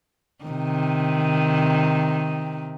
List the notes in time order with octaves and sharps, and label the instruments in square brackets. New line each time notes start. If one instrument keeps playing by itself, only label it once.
[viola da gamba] C3 D#3